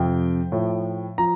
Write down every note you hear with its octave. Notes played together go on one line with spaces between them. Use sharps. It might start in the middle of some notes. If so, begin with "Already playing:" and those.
Already playing: F2 C3 F3 G5
A2 F3
F3 A#5